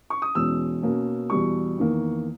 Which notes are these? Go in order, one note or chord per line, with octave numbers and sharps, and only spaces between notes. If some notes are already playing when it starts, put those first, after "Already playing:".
C#6
D#6
E2 B2 G#3 C#4 E6
B2 A#3 C#4
E2 B2 G3 C#6
E2 D#3 A#3